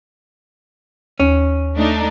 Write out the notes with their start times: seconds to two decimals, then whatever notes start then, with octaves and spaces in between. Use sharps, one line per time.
1.20 D#2 C#4
1.76 A3 D4 D#4